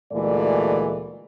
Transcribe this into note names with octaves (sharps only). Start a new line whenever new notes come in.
D2 A#2 E3 G#3 A3 D5